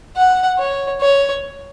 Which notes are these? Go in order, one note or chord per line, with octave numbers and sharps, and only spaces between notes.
F#5
C#5
C#5